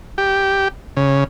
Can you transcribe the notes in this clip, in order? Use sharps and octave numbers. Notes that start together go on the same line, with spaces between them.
G4
C#3